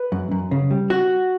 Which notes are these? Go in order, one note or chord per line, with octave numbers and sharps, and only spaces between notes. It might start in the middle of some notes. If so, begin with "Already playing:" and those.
Already playing: B4
F#2
F#2
C#3
G3
F#4